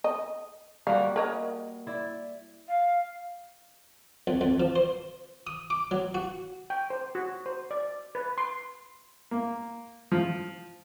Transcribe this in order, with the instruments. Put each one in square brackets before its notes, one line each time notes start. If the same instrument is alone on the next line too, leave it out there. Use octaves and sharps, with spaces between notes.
[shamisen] D#5
[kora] G3 A#3 F#4 [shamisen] F5
[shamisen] A#4 C#5 D#5
[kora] E4 D5
[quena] F5
[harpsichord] F2
F2
F3
C5
D#6
D6
F#3
F#4
[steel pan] G5
C5
F#4
C5
D5
B4
C6
[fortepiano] A#3
F3